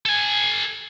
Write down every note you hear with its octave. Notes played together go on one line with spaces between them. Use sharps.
A4 G#5